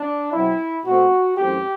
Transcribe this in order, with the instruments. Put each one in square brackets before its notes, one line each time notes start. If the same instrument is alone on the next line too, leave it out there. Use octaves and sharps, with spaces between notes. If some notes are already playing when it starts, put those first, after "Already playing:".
Already playing: [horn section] D4
B2 F#3 C4 E4
B2 A3 C4 F#4
F#2 E3 A3 C4 G4